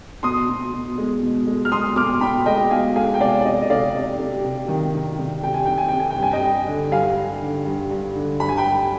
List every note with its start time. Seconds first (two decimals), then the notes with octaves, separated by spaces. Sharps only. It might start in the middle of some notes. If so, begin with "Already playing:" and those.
0.23 B2 C6 D#6
0.49 B2
0.74 B2
0.98 G#3
1.22 B2
1.47 G#3
1.65 F6
1.72 B2 C6 D#6
1.96 B2 D6 F6
2.21 B2 G5 B5
2.46 G#3 D#5 G5
2.71 B2 F5 G#5
2.95 G#3 F5 G#5
3.14 G5
3.20 C3 D5 F5
3.41 D5
3.45 C3 D#5
3.62 D#5
3.70 C3 D5 F5
3.94 C3
4.20 C3
4.44 C3
4.68 D#3
4.94 C3
5.19 C3
5.43 C3 G5
5.54 G#5
5.66 C3 G5
5.78 G#5
5.89 C3 G5
6.00 G#5
6.11 G5
6.17 G2
6.23 G#5
6.33 D#5 G5
6.42 G3
6.67 D3
6.92 G2 F5 G#5
7.17 G3
7.41 D3
7.66 G2
7.91 G2
8.16 D3
8.40 G2 B5
8.49 G#5
8.58 G5 B5
8.64 G3